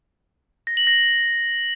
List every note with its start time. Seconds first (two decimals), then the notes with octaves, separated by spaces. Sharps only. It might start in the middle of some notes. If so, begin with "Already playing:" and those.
0.67 A#6
0.77 F#7
0.87 A#6